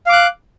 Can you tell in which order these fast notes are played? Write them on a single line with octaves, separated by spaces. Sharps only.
F5 D6 F#6